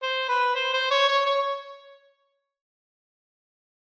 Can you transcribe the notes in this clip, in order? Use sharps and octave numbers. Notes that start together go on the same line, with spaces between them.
C5
B4
C5
C5
C#5
C#5
C#5